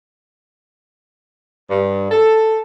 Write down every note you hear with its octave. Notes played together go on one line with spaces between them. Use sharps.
G2
A4